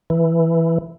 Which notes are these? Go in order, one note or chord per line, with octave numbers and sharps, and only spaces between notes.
E3